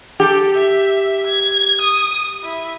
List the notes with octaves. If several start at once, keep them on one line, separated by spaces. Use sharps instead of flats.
G4 A4
E5
G#6
D#6
E4